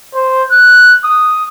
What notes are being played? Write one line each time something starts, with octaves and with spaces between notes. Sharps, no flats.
C5
F#6
D#6